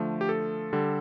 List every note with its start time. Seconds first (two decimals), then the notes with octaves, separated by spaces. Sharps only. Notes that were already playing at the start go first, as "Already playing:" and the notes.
Already playing: D3 F3 A3
0.21 G4
0.29 A4
0.73 D3 G3